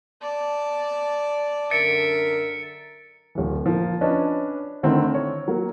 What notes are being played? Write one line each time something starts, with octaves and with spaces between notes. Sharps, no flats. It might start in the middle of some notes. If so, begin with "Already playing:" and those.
D5 A5
F#2 D3 A#4 E5 A6 C#7 D7
D1 E3
F3 A#3
C#4 D4 B4 D#5 A5
D3 D#3 A3 C4 D#4 E4
C#5
F#3 A#3